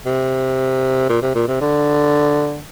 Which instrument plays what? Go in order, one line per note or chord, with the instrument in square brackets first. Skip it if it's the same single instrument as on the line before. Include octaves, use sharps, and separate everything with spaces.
[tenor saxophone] C3
A#2
C3
A#2
C3
D3